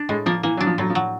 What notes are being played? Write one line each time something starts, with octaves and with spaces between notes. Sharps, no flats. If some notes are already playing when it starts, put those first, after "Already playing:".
Already playing: D4
A2 G#3
F3 A#3
E3 A#3
F#3 D4
F3
A2 F#3
F3
F#3